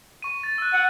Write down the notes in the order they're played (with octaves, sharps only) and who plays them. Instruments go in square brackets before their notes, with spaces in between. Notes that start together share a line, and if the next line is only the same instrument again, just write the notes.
[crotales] C#6 D#7
A6
E6 F#6
[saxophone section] F#5